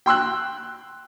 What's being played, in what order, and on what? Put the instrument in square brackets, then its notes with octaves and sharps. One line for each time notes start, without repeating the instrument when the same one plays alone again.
[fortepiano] G5 C6 E6 F#6